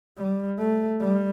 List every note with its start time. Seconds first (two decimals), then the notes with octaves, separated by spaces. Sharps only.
0.18 G3
0.58 A3
1.00 G3